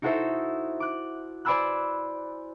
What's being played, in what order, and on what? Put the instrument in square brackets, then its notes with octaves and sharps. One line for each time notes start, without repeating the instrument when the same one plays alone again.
[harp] D#4 E4 F#4 A4 C5 E5
D6 F#6
C5 D5 G#5 B5 E6 F#6